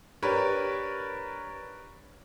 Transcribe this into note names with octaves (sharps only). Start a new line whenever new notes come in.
D4 G4 A#4 B4 C#5